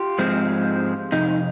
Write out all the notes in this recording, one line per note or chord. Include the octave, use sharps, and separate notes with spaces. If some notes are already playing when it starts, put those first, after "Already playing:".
Already playing: F4 G4
G#2 F3 G#3 C4
F2 C3 D#4